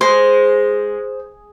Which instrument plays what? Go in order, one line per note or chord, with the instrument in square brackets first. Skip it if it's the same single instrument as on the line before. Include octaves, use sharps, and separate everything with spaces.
[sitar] G#3 [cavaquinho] C5